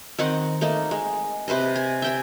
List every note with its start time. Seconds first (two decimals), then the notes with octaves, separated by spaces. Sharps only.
0.19 D#3 C4 D#5 F#5
0.61 A3 A#3 D#4
0.91 G#3
1.48 C3 B4 C5 D#5
1.76 G#5
2.02 E5 G5 G#5